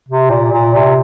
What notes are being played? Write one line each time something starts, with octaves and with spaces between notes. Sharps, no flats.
C3
A#2
A#2
C3